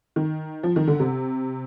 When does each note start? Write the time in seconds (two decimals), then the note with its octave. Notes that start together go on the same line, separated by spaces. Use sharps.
0.16 D#3
0.63 F3
0.76 D#3
0.87 D3
1.00 C3